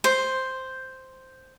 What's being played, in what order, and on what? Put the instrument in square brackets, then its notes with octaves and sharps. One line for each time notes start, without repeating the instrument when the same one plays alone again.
[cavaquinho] C5